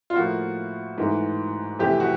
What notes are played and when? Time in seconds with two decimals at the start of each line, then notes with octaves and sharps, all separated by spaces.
0.10 F4
0.16 A2 F3 A#3 F#4
0.98 G#2 E3 A3
1.79 F2 C3 E3 A3 G4
2.00 F#4